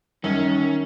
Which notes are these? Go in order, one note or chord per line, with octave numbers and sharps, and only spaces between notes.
F#2 D#3 G3 C#4